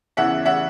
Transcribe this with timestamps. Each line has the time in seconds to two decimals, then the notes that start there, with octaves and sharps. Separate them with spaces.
0.17 E2 C#3 E3 E5 F#5
0.45 E5 F#5